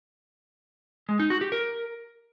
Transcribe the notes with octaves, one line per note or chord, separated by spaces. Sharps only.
G#3
D#4
F#4
G4
A#4